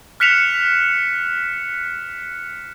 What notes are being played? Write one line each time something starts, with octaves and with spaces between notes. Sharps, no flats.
F6 F#6 B6 C#7 E7 F7